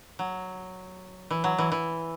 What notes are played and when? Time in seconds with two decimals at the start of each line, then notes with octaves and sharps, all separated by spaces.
0.19 F#3
1.31 E3
1.44 F#3
1.58 E3
1.72 E3